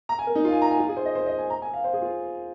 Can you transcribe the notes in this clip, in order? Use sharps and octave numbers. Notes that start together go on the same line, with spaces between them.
A#5
G#5
A#4
D#4
F4
G#5
A#5
G#5
F4
G#4
C5
D#5
C5
D#5
G#5
A#5
G#5
F5
C5
G#4
F4